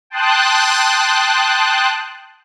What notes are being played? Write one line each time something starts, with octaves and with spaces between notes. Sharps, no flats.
G5 A5 C6 D#6 F#6